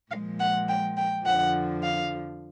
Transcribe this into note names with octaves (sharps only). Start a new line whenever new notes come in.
A#2 F3 G#3 F5
F#5
G5
G5
F2 D3 F3 F#5
F5